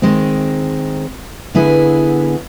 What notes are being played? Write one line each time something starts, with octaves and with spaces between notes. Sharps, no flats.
D#3 G#3 C4
D3 B3 E4 G#4